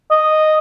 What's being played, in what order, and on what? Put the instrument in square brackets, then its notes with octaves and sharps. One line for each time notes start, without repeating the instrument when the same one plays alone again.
[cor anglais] D#5